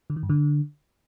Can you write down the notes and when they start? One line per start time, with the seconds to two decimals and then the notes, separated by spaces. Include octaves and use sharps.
0.10 D3
0.16 D#3
0.23 G2
0.30 D3